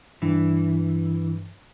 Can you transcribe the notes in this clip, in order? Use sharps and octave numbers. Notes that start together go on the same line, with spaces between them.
G2 E3